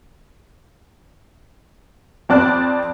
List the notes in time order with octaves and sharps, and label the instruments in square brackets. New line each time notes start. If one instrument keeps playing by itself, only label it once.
[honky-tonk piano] F2 C4 D5 A5 F#6